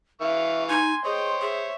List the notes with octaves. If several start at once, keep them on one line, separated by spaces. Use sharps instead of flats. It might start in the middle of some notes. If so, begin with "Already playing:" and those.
E3 E5 F5 C#6
D#4 G#5 C6
G#4 C5 C#5 D#5 G5
G#4 E5